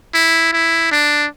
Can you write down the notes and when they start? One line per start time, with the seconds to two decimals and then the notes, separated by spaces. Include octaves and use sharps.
0.14 E4
0.52 E4
0.91 D4